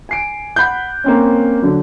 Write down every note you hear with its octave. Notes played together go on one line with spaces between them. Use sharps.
G#5 C7 D7
F#5 B5 F#6 G6
A#3 C4 C#4
D3 F#3